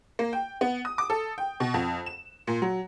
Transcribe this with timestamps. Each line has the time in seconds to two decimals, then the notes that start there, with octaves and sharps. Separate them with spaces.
0.19 A#3
0.33 G5
0.61 B3
0.85 D#6
0.98 D6
1.10 A4
1.38 G5
1.60 B2
1.74 F2
2.06 E7
2.47 A#2
2.62 F#3